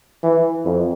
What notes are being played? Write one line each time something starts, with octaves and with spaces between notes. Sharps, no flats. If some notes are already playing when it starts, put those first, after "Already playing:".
E3
F2